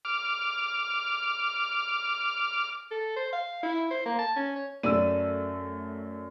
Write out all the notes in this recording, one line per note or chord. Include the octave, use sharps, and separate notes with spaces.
D6 F6
A4
C5
F5
E4
C5
A#3
A5
C#4
C#5
F#2 A3 D5 E6 D#7